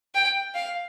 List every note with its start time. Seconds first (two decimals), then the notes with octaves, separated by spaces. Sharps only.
0.14 G5
0.54 F5